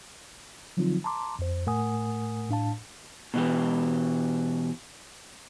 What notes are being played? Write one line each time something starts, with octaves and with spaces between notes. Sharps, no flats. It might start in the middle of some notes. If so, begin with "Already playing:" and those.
D3 F3 F#3 C4 D#4 F4
A5 A#5 C6 D6
F2 C5
A2 A3 A#4 F#5 G#5 D#6
A2 D4 F5 A5
B2 E3 G4